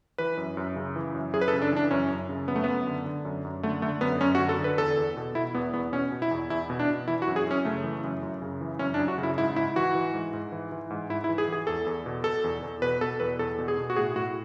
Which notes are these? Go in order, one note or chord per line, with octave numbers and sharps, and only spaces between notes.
E3 B4
F#2
F#2
C#3
E3
F#2
F#2 G#4
B4
A4
C#3
D4
E3 D4
F#2 C#4
F#2
C#3
F#2 B3
A3
F#2 B3
D3
D3
F#2
F#2
D3 A3
D3 A3
F#2 B3
F#2 C#4
F#4
D3
A4
D3
B4
E2 A4
E2
B2
B2 E4
E2 B3
E2 B3
B2 C#4
B2
E4
E2
E2 E4
B2
D4
B2
E3 E4
F#4
F#2
G#4
F#2 C#4
C#3 A3
E3
F#2
F#2
C#3
E3
F#2 C#4
D4
F#2
F#4
C#3
E4
G#2 E4
G#2 E4
E3 F#4
E3
G#2
G#2
E3
E3
G#2
G#2 E4
E4
E3
G#4
E3
G#4
E2 A4
E2
B2
B2 A4
E2
E2
B2 B4
B2 A4
E2 B4
E2 A4
B2
G#4
B2
F#4
A2 G#4
A2 F#4